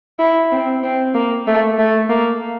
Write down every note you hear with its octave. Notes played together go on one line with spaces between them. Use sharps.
E4
C4
C4
A#3
A3
A3
A#3